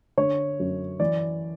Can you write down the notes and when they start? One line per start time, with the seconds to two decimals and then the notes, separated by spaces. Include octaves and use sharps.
0.17 D3 C#5
0.60 F#2
1.00 E3 D5